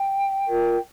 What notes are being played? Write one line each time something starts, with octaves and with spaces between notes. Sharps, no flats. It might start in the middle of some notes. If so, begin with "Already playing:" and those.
Already playing: G5
F4 A#4